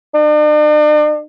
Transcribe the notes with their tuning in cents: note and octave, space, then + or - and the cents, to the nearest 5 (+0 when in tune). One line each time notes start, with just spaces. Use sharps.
D4 +45